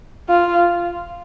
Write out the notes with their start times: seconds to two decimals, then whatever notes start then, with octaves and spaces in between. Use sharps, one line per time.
0.28 F4